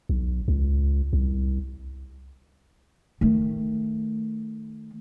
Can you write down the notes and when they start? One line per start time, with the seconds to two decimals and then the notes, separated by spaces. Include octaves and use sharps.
0.09 B1
0.48 C#2
1.13 C2
3.21 D#3 A3